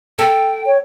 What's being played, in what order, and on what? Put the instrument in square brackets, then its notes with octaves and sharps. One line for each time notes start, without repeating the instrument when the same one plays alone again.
[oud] A4 [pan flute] G5
[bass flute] C#5